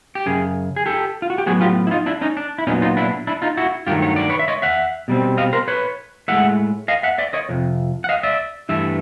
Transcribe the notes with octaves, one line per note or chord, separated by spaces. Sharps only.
G4
F#2 C#3 G#4
G#4
G4 A4
F4
F#4
G4
A2 F#3 B3 F#4 G#4
F4 G4
E4
D#4 F4
D4 E4
C#4 D#4
D4
E4
A#2 F#3 B3 C#4 D#4
D#4 F4
D4 E4
D4 E4
D#4 F4
E4 F#4
G2 D#3 F#3 A3 F4 G4
C#5
D5
B4 C#5
E5
C#5 D#5
E5 F#5
B2 G3 C4
D#5 F5
A#4 C5
B4 C#5
A2 F3 G#3 E5 F#5
D#5 F5
E5 F#5
D5 E5
C#5 D#5
F2 C3
F#5
D#5 F5
D5 E5
G2 E3 A3 E5